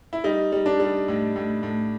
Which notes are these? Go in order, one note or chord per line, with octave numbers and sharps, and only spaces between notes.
E4
G3 D#4
G3
D4
G3
A2
A2
A2